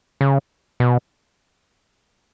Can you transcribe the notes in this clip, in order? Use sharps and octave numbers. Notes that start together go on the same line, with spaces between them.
C#3
B2